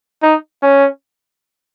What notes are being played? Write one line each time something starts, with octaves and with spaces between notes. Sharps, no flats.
D#4
C#4